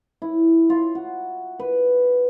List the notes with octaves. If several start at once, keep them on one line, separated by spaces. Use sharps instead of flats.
E4
F4
F#4
B4